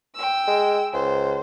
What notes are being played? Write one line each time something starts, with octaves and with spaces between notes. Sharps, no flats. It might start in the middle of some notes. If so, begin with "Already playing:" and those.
G5 E6
G#3
C#2 C5